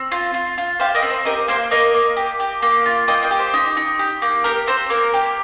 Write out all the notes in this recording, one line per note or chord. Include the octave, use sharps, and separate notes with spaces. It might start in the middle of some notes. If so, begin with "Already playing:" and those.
Already playing: C4
F4
F4
F4
G4 C5 F5
A#4 D#5
C4
C5
G4 A#4 D#5
A#3 C5 F5
A#3 A#4 D#5
A#3
G4
G4
A#3
F4
A#3 D#5 G5
D#5 G5
G4
C5
D#4
D#4
G4
A#3
G4 A#4
C4 C5
A#3 A#4
G4